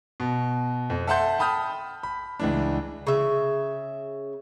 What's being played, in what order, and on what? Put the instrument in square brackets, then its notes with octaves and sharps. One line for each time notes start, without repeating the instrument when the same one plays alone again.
[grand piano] B2
F2
A4 E5 F#5 A5 C6 G6
G5 A5 B5 D#6 F6 G6
B5
C#2 E3 D4
[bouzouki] C#3 E5